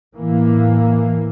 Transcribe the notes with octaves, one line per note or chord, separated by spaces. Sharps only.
A2 E3 A#3